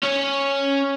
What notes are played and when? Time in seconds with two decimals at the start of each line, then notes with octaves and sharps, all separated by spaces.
0.03 C#4 C#5